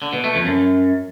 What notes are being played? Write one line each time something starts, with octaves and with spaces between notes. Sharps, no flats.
D3
B2
A3
F2
F#2